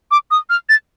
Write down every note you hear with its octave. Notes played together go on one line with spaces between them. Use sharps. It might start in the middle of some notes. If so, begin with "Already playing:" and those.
D6
D#6
F6
A6